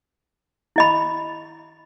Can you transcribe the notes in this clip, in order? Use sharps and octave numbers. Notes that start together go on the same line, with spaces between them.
E4 D#5 B5